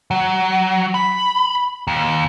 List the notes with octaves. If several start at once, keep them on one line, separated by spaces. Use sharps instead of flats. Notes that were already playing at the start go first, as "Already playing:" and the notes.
F#3
B5
D#2